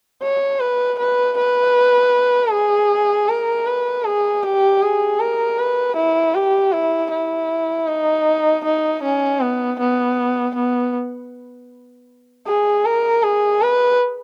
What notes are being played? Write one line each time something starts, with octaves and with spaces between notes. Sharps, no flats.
C#5
B4
B4
B4
G#4
A#4
B4
G#4
G4
G#4
A#4
B4
E4
G4
E4
E4
D#4
D#4
C#4
B3
B3
B3
G#4
A#4
G#4
B4